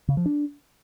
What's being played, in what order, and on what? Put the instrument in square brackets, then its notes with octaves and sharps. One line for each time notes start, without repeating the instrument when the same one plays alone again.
[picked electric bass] C#3
F3
D4